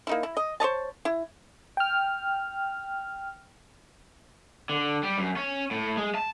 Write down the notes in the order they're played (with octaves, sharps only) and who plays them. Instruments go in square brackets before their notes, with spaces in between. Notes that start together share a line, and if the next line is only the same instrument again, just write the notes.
[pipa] A#3 D#4 E4
E4
D#5
C5 C#5 D#5 A5
E4
[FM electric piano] G5 F6
[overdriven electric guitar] D3
G3
F#2
C#4
A2
G#3
A5